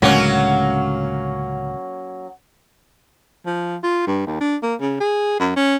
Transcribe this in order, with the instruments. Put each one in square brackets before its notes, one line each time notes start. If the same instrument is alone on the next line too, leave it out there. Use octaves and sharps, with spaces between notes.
[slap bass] C#2 A2 D3 [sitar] F#3 A#3 C#4
[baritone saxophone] F3
F4
G2
D#2
D4
A#3
C#3
G#4
F#2
C#4